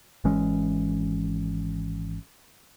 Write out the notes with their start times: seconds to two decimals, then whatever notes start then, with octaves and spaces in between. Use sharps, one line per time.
0.24 G#1 E3 G#3 C#4